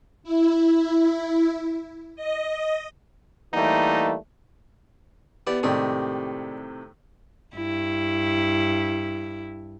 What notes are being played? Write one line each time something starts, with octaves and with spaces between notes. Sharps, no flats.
E4
D#5
E3 G3 A3 A#3 D#4
E3 B3 G4 D5
A2 C3 D#3 G#3 D4 G4
G2 E4